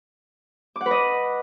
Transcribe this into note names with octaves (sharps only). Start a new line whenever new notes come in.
D6
F#5
B4
D#5